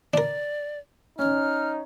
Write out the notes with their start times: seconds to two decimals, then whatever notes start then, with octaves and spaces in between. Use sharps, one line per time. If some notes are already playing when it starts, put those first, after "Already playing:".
0.14 D4 A#4 D5
1.19 C#4 D#4 F6